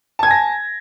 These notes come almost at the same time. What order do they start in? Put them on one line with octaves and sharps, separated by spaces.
A5 G#6 G#5 A#6